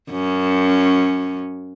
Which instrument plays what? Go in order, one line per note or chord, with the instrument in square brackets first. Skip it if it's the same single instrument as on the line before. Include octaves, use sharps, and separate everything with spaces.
[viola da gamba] F#2 C#4